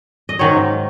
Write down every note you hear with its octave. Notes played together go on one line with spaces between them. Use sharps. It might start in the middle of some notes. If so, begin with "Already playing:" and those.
D#5
G#2 D#3 F#3 C#5